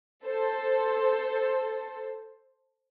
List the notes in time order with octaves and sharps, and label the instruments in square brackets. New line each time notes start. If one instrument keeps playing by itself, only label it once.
[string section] A4 C5